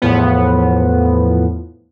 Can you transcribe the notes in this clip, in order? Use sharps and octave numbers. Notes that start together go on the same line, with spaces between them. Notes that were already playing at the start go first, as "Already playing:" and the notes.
E2 A2 F3 B3